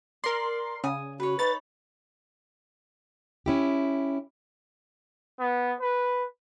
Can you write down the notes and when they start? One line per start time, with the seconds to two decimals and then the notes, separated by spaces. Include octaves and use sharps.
0.24 A#4 D5 C6
0.84 C#3 G#5 D#6
1.20 F#4 B4 C#5
1.39 D#4 B4 C#5 B5 A6
3.46 C#4 E4 G4
5.40 B3
5.81 B4